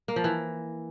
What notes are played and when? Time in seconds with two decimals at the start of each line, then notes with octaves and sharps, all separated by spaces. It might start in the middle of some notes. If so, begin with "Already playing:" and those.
0.08 A#3
0.16 F3
0.24 E3